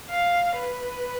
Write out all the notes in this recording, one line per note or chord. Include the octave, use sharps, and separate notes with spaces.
F5
B4